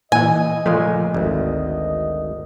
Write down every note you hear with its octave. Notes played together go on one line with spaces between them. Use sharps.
A#2 E3 D#5 G#5
A#2 C#3 F3 G#3 A3
G#1 D2